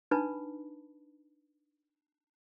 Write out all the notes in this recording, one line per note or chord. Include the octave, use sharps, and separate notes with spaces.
D4 D#4 B4 A5 B5